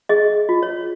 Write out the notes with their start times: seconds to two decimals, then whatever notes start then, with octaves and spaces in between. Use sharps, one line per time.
0.09 G#4 D#5
0.49 F4
0.63 C#5